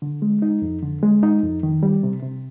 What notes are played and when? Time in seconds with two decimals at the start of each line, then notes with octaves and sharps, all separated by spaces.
0.02 D3
0.22 G#3
0.42 D#4
0.62 F2
0.82 D3
1.03 G#3
1.23 D#4
1.43 F2
1.63 D#3
1.83 G3
2.03 C3
2.23 C3